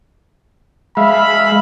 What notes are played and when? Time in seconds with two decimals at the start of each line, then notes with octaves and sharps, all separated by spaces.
0.97 G#3 E5 F5 B5